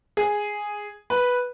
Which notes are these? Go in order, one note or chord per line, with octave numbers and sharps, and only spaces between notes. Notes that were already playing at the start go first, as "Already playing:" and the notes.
G#4
B4